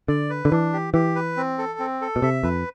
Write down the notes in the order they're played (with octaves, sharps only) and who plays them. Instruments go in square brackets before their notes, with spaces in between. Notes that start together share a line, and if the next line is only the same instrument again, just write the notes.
[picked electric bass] D3 [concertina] D5
[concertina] B4
[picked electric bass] D3
[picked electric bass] E3 [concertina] D4
[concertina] G4
[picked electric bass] E3 [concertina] G4
[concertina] B4
C4
A4
C4
A4
[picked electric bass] B2
[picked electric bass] C3 [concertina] E5
[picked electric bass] F2 [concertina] B4